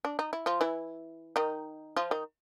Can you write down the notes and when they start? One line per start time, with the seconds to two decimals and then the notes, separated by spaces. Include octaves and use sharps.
0.05 D4
0.19 D#4
0.33 E4
0.46 F3 F4
0.61 E3 E4
1.36 D#3 D#4
1.96 F3 F4
2.11 D#3 D#4